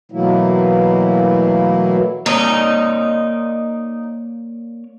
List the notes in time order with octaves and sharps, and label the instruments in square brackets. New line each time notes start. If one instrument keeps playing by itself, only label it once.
[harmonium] B2 E3 F#3 A3 A#3 E4
[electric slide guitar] A#3 C#5 D5 [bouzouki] D#4